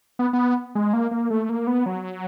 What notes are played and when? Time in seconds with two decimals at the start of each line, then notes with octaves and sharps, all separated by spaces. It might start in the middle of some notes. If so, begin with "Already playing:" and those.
0.19 B3
0.33 B3
0.75 G#3
0.93 A#3
1.11 A#3
1.30 A3
1.49 A#3
1.67 B3
1.86 F#3